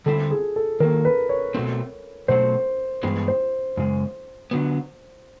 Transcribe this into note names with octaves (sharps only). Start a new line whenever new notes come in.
D3 G3 C4 E4 A4
G#4
A4
D#3 F#3 A#3 A#4
B4
C#5
B2 F#3 A3 C4
B2 F#3 A3 C4 C5
G2 E3 G#3 B3
C5
F#2 C#3 G#3
D3 F#3 B3